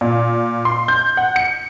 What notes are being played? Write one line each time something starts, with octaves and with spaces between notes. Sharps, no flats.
A#2
C6
G6
F#5
C#7